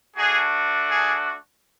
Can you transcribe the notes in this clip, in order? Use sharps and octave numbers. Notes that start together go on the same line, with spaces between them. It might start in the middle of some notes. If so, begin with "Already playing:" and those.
A3 D4 F#4 G#4
G#4